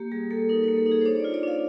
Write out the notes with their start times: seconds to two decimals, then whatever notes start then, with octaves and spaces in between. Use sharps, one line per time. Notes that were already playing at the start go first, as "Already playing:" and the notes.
Already playing: A#3 G4
0.12 G3 G#4
0.31 A#3 A4
0.49 D#4 A#4
0.64 A#3 B4
0.77 A4
0.86 D#4
0.92 G#4
1.01 C5
1.06 D4 C#5
1.20 F4 D5
1.34 D5
1.43 D4 F5